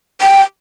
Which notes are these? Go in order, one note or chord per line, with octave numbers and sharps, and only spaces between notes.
G5